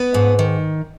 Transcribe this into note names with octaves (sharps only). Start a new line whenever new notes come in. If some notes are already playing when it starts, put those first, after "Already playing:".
Already playing: B3 B4
G#2
D#3